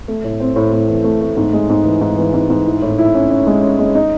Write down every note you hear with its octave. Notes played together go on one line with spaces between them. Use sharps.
A3
A2
C4
A2
A2
E3
A3
A3
G#2
G#3
G#2
E3
G#2
E3
G#2
G#2
E4
A2
E4
C#4
C#4
G#3
C#4
G#3
D#4